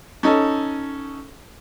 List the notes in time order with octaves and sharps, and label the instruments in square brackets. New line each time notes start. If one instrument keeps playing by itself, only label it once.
[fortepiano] C#4 D#4 A4